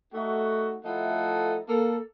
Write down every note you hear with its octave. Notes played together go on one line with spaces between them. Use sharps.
A3 D#4 F#4
F3 A3 D#4 E4 A4 F#5
A#3 A4